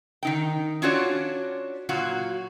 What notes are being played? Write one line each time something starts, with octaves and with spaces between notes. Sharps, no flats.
D#3 D#4 G5
C#4 D4 F4 F#4 C#5 D5
A#2 F#3 F4 F#4